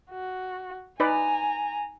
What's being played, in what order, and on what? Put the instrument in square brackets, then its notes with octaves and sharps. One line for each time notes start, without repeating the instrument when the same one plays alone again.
[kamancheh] F#4
[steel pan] D#4 B4 D5 [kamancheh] G#5 A#5